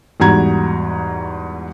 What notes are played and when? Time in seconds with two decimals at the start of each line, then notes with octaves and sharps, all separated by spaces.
0.20 E2 G#2 G3 F#4 A#5 G#6